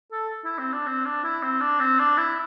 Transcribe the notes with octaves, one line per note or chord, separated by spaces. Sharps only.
A4
E4
C4
D4
C4
D4
E4
C4
D4
C4
D4
E4